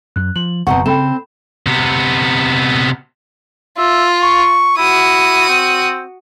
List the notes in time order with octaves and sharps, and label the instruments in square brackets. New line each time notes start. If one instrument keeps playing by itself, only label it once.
[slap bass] F#2 [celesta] F#6
[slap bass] F3 [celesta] F#7
[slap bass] F#1 F2 [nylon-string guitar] B2 C4 F#5 [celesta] A#5 C#6
[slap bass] C#3 [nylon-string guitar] C4 A4 [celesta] G5 B5 E7
[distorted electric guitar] C3 B3
[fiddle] F4 [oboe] E5
[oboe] C#6
[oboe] E4 [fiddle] F#4 D#6
[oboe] C4